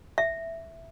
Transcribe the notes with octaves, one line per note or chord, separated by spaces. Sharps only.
E5